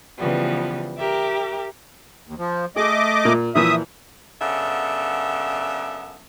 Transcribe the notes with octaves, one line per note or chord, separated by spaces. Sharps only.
C#3 E3 F3 G3 B3
G4 A#4 E5 D6
D#2
F3
A3 G#4 D#5 D6
A#2
A#2 E3 F3 E5 D#6
F#2 C#3 B3 D4 A4 E5